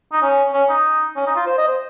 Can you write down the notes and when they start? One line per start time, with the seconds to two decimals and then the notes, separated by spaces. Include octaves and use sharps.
0.13 D#4
0.22 C#4
0.53 C#4
0.69 D#4
1.16 C#4
1.27 D#4
1.36 F4
1.46 C5
1.58 D#5
1.67 C5